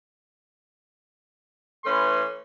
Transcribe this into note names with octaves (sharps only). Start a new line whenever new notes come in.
E3 A3 C#4 B4 C6